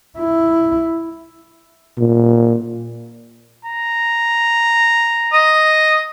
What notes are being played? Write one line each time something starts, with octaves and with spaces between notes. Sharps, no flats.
E4
A#2
A#5
D#5